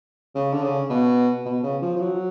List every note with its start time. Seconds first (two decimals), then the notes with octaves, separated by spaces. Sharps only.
0.35 C#3
0.53 D3
0.63 C#3
0.90 B2
1.46 B2
1.64 C#3
1.82 F3
1.96 F3
2.00 F#3